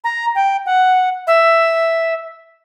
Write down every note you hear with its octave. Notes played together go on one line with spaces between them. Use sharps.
A#5
G5
F#5
E5